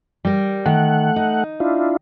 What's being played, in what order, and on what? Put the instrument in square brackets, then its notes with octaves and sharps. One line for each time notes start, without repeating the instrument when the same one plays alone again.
[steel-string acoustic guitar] G3 A#4
[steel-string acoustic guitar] D#3 [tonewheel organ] A3 F#5
[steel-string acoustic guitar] D#4
[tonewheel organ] D4 E4 F4